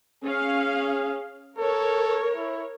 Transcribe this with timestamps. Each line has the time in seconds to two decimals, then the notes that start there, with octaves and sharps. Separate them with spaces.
0.24 C#4 G#4 F5
1.58 A4 A#4 C#5
2.36 E4